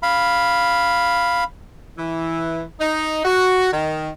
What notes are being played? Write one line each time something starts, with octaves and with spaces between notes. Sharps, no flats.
F5 B5
E3
D#4
F#4
D#3